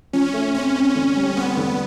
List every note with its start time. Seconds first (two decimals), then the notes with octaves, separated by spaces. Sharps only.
0.13 F3 C#4
0.33 A3
0.54 C4 C#4
0.75 C4
0.95 D3
1.16 G3
1.36 B3 C4
1.57 D3